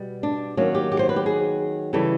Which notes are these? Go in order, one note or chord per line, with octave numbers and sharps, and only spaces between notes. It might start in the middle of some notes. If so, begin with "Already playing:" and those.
Already playing: B2 G3
D4
D#3 F#3 A#3 C#4
G4
G4
C5
B4
G4
G#4
C#3 E3 G3 A4